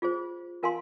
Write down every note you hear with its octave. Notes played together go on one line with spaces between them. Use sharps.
F4 G#4 C5
F4 A#4 F5 G#5 C6